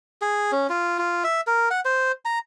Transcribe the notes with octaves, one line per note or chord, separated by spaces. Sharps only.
G#4
C#4
F4
F4
E5
A#4
F#5
C5
A#5